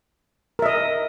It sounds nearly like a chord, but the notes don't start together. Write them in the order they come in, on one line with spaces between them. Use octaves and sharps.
A#4 E5 D#5